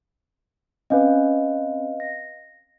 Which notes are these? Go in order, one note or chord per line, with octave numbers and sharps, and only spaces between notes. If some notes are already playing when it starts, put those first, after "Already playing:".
C4 C#4 B4 D#5 F5
A#6